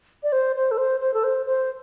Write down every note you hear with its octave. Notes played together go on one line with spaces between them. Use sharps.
D5
C5
C5
A4
C5
C5
A4
C5
C5